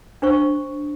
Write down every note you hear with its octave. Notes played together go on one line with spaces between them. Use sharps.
D4 C5 C#6